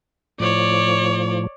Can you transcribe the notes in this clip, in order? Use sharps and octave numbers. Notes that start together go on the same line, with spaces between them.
A2 F3 C#5 D5